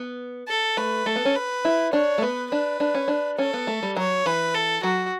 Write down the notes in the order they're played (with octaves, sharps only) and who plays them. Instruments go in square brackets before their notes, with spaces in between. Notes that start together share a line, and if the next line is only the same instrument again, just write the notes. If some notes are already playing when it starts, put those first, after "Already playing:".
Already playing: [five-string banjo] B3
[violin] A4
[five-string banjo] A3 [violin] B4
[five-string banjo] A3 [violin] A4
[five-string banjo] B3
C#4
[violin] B4
[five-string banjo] E4
[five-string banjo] D4 [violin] C#5
[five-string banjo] A3
[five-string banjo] B3 [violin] B4
[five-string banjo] D4 [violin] B4
[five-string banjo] D4
C#4
D4
[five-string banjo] C#4 [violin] A4
[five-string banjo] B3
A3
G3
[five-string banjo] F#3 [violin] C#5
[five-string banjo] E3 [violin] B4
[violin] A4
[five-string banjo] F#3 [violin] F#4